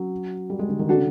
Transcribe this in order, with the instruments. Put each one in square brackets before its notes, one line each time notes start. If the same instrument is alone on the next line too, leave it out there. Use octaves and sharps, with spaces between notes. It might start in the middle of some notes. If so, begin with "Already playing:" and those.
Already playing: [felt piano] F#3 [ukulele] C#4
[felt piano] G3
G#3
D3
D#3
[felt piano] D3 [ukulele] D4 F#4 A4
[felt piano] C#3